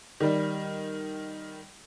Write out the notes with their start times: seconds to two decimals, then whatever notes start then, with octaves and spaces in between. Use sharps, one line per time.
0.20 D#3 G3